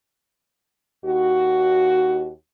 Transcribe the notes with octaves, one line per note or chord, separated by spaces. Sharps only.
D#2 F#4